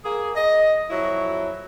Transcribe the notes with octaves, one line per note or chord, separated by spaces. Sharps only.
A#3 G#4
D#5
F2 F#3 E4